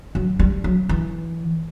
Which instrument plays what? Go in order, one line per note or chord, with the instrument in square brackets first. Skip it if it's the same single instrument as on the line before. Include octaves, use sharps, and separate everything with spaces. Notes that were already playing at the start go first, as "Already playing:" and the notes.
[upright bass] F#3
G3
F#3
E3